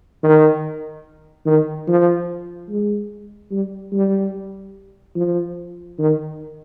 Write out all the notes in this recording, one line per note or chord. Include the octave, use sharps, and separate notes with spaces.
D#3
D#3
F3
G#3
G3
G3
F3
D#3